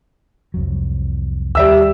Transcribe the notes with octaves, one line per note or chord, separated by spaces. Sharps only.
C2 F2 F#3
D#2 G3 E5 E6